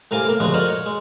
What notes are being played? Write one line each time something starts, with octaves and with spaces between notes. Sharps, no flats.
A2 C3 A#4 F5 G#5 D6
A2 A#3
D2 A#2 C#3 F3 G#3 F#4
F4 F#4 A#4 C5 D5 D#5
C#5
G#3